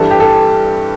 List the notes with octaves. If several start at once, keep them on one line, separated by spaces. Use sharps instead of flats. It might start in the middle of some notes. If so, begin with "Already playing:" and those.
Already playing: G2 E3 G3 A4
G4
A4